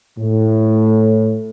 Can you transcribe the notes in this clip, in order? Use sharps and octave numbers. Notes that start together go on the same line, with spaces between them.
A2